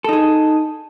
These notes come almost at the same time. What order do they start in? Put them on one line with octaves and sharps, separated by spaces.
A4 D#4 G#4